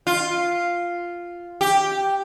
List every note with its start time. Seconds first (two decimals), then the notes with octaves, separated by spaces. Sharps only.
0.07 F4
1.61 G4